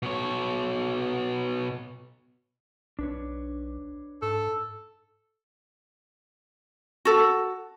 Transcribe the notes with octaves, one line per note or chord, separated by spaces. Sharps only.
B2 C#5
B1 D4 B4 C#5
G#2 A4
F#4 A4